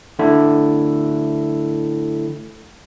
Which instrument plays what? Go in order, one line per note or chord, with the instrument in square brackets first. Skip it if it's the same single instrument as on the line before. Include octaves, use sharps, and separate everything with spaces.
[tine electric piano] D3 A3 E4 A4